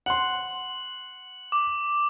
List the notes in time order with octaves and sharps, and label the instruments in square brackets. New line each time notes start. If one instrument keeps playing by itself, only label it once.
[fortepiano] F#5 C6 [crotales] F#7
[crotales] D6